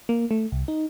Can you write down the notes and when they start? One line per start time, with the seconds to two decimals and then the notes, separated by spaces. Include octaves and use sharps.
0.09 A#3
0.31 A3
0.52 C2
0.68 D#4